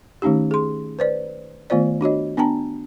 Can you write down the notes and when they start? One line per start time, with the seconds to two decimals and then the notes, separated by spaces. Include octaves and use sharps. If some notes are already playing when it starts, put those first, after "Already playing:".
0.22 D#3 A3 C#4 D#4 G4
0.51 G#4 C6
0.99 B4 C5 D5
1.70 D#3 A3 B3 F4 C5 D5
2.01 D4 F#4 C#5 D#5
2.37 B3 D4 G5 A5 A#5